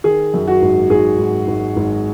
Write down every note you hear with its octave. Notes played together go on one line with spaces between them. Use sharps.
D#3 G#4
F#2
F#4
G#1
G#1 G#4
G#1
G#1
G#1